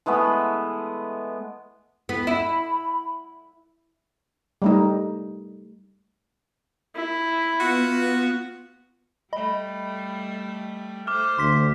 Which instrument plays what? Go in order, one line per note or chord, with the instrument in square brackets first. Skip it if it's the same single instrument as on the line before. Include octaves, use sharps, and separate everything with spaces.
[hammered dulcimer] E3 G#3 A3 B3
[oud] B3 [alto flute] E4
[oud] E4 [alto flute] B5
[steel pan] G3 A3 D#4
[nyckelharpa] E4
[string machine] B3 [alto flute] F4 [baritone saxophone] F#4
[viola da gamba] G3 A3 [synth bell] D#5 B5
[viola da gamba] A3 C5 [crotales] D6 F6
[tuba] D2 [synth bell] C6 B6